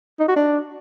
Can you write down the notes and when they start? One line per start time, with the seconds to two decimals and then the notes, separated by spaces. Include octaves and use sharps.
0.19 D#4
0.28 F#4
0.36 D4